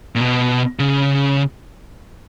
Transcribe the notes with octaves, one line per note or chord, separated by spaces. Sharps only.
A#2
B2
C#3